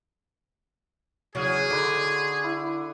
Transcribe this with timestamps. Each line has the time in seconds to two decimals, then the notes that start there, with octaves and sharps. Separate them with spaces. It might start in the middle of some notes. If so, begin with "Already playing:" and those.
1.35 E2 C#3 F#3 F#4 G#4 F5
1.70 D3 D#4 B4 C5
2.43 E4